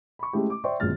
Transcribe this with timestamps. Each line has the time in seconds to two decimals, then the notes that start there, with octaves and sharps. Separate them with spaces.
0.19 B5 C#6
0.33 G#3 A3 C#4 E4 G4
0.50 D6
0.64 C5 D5 E5 G5 C6 C#6
0.80 G1 F#2 A#2 G#3 F6 A6